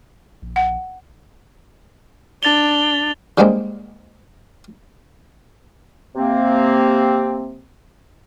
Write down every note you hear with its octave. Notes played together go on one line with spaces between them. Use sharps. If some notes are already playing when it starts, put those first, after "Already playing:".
A#1
F#5
D4 A6 F7 G7
D3 G3 G#3 A#3 C4
C3 A#3 C4